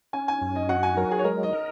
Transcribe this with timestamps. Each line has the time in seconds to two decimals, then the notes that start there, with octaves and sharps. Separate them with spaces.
0.13 C#4 G#5
0.28 G#5
0.42 F#2
0.55 D#5
0.69 F#4 F#5
0.83 G#5
0.97 F#3 A#4
1.11 G#4
1.19 C#5
1.24 G#3 A#4
1.43 D#5
1.53 A#4